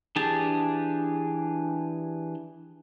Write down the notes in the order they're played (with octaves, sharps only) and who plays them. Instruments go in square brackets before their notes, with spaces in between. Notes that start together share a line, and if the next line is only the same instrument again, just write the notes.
[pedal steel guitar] E3 D4 G4 G#4 A5